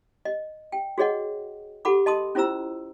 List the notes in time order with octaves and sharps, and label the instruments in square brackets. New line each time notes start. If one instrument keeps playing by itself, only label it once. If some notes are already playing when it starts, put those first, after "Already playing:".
[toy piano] D#5
G5
F#4 G#4 C#5 D#5 F#5
G4 A4 F#5 B5 D6
D#5 A5 C6 D#6
C#4 E4 F4 C5 A#5 E6